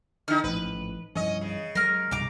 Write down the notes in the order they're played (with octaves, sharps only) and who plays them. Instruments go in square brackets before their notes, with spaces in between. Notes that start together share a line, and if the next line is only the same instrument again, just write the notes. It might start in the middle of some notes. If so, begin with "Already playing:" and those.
[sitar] D3 D#4 [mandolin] F6
[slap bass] A1 G#2 F3 [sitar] B4
[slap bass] G2 E3 F3 [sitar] C#4 D#5
[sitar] C#3
[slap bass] F#3 G#3 [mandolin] A#4 F6
[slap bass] C2 G2 B2 [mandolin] A#5 D6